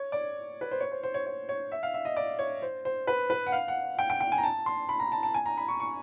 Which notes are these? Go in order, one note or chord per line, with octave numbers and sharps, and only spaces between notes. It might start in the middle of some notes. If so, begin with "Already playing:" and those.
Already playing: C#5
D5
B4
C5
C#5
C5
C5
C#5
C#5
C#5
E5
F5
E5
D#5
D5
C#5
C5
C5
B4
B4
F#5
F5
F#5
G5
G5
G5
G#5
A#5
A5
C6
B5
A#5
A5
A5
G#5
A#5
B5
C#6
C#6